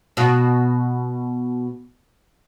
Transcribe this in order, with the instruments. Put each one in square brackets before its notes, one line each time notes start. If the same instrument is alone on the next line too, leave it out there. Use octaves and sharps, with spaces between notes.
[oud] B2 F#4